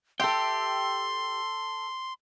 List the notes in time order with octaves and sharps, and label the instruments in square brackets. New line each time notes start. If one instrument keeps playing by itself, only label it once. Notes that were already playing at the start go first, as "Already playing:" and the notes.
[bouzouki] G4 E5 [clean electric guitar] A4 G5 [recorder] C6